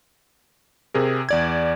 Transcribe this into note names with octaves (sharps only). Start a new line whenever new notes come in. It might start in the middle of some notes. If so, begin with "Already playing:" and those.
C3 G#4 A#4
E2 D5 G#6